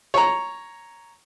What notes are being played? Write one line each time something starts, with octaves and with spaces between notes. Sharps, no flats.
C#5 A#5